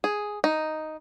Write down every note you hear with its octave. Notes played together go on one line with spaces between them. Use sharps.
G#4
D#4